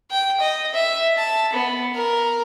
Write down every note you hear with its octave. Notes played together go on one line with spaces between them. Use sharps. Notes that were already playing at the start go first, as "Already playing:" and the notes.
G5
D#5
E5
A5
B3
A#4